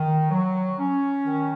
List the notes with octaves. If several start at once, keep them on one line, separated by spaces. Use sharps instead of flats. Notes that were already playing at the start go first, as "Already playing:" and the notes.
Already playing: D#3
F#3
C#4
D#3